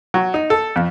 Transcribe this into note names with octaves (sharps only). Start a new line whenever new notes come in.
F#3
D#4
A4
F2